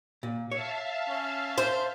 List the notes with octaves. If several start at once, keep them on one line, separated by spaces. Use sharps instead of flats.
A#2
C#5 E5 F5 A5
C#4
C5